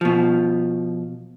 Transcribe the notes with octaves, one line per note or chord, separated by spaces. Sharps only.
B2 F3